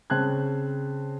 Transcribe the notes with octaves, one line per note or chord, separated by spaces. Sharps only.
C#3 C4 A5 F#6 G#6